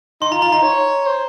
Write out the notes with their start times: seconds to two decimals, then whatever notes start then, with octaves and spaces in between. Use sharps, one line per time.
0.21 D#4 C6
0.31 F4 A#5
0.42 F4 A#5
0.52 D#4 A#5
0.63 C#5
1.06 C5